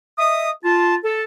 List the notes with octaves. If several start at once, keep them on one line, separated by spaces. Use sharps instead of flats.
D#5 E5 D#6
F4 A5
A4